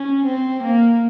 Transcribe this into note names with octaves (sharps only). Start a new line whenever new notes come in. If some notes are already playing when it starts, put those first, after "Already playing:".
Already playing: C#4
C4
A#3